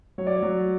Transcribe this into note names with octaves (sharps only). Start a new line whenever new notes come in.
F#3 C#5
D5
C#5
F#3